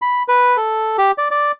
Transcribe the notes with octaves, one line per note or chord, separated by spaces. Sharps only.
B5
B4
A4
G4
D5
D5